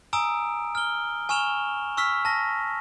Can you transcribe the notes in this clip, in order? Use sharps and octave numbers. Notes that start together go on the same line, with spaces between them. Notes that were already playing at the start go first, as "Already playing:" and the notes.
G#5 A#5 D#6 E6 D7
F6 G7
G#5 C#6 F6 E7 F7 G7
C#6 E6 F6 B6
A5 A#6